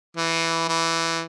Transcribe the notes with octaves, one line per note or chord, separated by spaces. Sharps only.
E3
E3